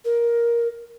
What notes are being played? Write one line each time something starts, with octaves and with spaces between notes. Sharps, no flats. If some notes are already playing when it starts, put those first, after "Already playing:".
A#4